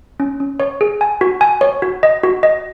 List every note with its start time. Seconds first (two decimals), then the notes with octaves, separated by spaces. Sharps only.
0.20 C#4
0.40 C#4
0.60 C#5
0.81 G#4
1.01 G#5
1.21 F#4
1.41 G#5
1.61 C#5
1.82 F#4
2.03 D#5
2.23 F#4
2.43 D#5